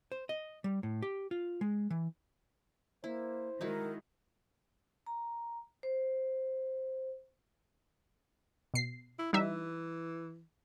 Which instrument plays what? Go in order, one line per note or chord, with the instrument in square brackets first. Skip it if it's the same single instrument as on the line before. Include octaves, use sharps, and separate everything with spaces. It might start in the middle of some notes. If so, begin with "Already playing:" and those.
[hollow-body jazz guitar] C5
D#5
G3
A2
G4
F4
G#3
E3
[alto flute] A#3 [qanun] E4 [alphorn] C5
[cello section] D#3 G#3 [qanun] D#4 E4 F#4 [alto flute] A#4
[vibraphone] A#5
C5
[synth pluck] B2 C7
[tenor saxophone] E4
[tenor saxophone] E3 [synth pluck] G3 D#4 E5